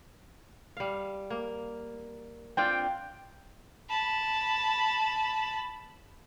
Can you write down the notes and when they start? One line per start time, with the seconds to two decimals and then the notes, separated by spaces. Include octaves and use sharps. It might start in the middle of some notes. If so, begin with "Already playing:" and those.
0.77 G3 F5
1.30 A#3
2.57 C4 D4 F4 G5
3.89 A5 B5